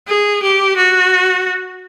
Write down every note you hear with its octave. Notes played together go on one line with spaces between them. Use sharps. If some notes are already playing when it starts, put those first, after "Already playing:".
G#4
G4
F#4